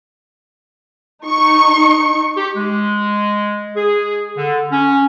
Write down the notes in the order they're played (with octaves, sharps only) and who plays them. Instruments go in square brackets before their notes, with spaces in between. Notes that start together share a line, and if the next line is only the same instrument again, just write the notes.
[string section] D#4 C#6 C#7
[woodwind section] G4
G#3
G#4
D3
C#4